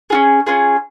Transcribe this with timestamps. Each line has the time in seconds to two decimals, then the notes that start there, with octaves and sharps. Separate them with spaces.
0.10 C#4 F4 G#4
0.47 C#4 F4 G#4